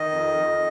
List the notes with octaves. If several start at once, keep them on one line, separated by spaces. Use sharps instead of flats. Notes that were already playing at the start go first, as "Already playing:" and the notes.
Already playing: D#3 D#5
F2
F2